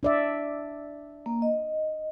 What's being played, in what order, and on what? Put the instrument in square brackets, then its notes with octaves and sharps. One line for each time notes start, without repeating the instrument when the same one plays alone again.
[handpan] D4 D5 E5
[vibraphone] A#3
D#5